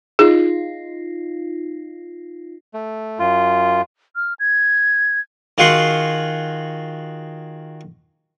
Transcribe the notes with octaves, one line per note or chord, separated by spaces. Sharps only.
D#4 F4 G#4
A3
F#2 F4
F6
G#6
D#3 F4 F#4 G#4 F#5 C6